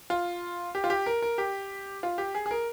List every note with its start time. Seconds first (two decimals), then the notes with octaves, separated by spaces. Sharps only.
0.10 F4
0.75 G4
0.84 F4
0.90 G4
1.06 A#4
1.22 A#4
1.38 G4
2.03 F4
2.18 G4
2.35 G#4
2.46 G#4
2.51 A#4